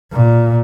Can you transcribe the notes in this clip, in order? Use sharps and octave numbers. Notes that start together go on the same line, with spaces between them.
A#2